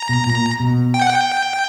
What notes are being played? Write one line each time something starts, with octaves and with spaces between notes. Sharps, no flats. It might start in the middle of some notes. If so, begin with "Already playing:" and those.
Already playing: A#5
B2
A#2
B2
G5
F#5
G5